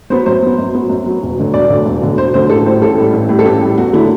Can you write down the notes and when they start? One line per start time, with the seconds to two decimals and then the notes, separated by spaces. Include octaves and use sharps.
0.10 F#3 B3 C5
0.26 F#2 C5
0.42 F#3 B3
0.58 F#2
0.74 F#3 B3
0.90 F#2
1.06 F#3 B3
1.22 E1
1.38 D2 D3 F#3
1.53 E1 D5
1.69 D2 D3 F#3
1.86 E1
2.02 D2 D3 F#3
2.17 E1 C5
2.34 D2 D3 F#3 C5
2.50 A1 A4
2.66 A2 C5
2.69 G3
2.82 A1 A4
2.98 A2 G3
3.13 A1
3.29 A2 G3
3.39 A4
3.46 A1 G4
3.61 A2 G3
3.78 E2 F#4
3.93 D3 F#3 A3 E4